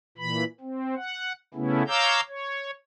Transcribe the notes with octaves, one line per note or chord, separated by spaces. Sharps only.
A#2 E3 B5
C4
F#5
C#3 A3 B3 C#4 E4
C#5 F5 A#5 D6 E6 G6
C#5